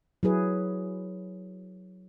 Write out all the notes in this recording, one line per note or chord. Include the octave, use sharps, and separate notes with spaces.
F#3 E4 G#4 B4